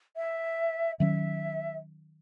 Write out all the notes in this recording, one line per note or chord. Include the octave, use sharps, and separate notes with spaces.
E5
D#3 F#3 C#4 E5